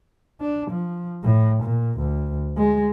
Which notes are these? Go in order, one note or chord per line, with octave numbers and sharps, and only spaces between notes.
D4
F3
A2
A#2
D2
G#3